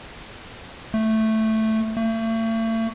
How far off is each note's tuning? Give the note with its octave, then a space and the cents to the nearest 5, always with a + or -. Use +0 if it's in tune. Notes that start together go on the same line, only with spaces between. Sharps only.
A3 +0
A3 +40